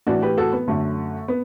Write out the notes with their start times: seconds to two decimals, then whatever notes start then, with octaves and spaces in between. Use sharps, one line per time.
0.07 A2 E3 D4 F#4
0.22 G4 B4
0.37 F#4 A4
0.53 B3
0.68 F#2 D3 A3
1.28 B3